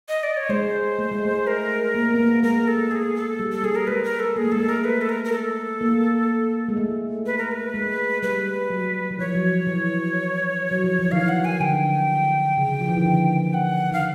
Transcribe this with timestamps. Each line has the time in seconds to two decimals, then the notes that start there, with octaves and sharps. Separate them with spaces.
0.09 D#5
0.23 D5
0.37 C#5
0.49 G#3 C5
0.99 A3
1.12 G#3
1.25 A3
1.47 A#4
1.95 A#3
2.14 B3
2.19 A#3
2.43 G#3 A#4
2.68 A4
2.91 G#4
3.16 A4
3.39 G3
3.52 A4
3.63 G3 G#4
3.75 A#4
3.87 G#3 B4
4.04 A#4
4.20 A4
4.36 A#3 G#4
4.44 A3
4.52 G#3 A4
4.60 A3
4.69 A#4
4.84 B4
5.01 A4
5.09 A#4
5.25 A#4
5.32 A4
5.81 A#3
6.69 G#3
6.77 A3
7.26 B4
7.38 A#4
7.52 B4
7.74 G#3
8.23 G3 B4
8.70 F#3
9.11 E3
9.19 F3 C#5
9.35 F#3
9.67 E3
10.71 F#3
10.84 F3
10.99 E3
11.11 D#3 F5
11.28 F#5
11.45 G#5
11.60 D3 G5
12.57 C#3
12.81 F3
12.88 E3
12.97 D#3
13.05 D3
13.54 F#5
13.91 D#3 F5